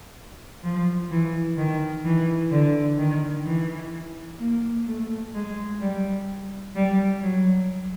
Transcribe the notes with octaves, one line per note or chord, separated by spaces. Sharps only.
F3
E3
D#3
E3
D3
D#3
E3
A#3
A3
G#3
G3
G3
F#3